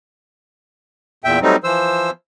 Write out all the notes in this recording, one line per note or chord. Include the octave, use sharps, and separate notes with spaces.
E2 A#2 E5 G5
F#3 G3 A3 C4 D#4
E3 F3 C5 E6